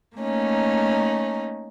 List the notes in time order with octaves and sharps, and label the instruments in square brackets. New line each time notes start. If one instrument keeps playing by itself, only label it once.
[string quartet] A3 A#3 C#4 D#4